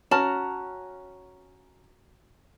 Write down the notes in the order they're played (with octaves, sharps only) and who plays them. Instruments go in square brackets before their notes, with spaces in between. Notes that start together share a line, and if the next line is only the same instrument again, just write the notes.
[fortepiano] C#4 [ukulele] F#4 A5 [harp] A#5 F6